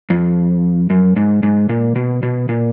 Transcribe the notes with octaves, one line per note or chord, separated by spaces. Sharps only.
F2
F#2
G#2
G#2
A#2
B2
B2
A#2